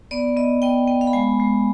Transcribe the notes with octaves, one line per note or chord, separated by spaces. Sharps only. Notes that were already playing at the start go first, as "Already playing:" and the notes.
B3 D5
B3 D#5
B3 G5
B3 G5
F5
B5
G#3 G#5
G#3